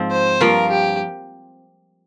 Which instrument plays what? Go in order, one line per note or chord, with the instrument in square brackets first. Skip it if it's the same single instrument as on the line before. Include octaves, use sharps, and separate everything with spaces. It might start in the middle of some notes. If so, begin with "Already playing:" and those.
Already playing: [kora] G#2 F3 C4
[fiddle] C5
[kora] G2 F3 A#3 F4 [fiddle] A#4
[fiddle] G4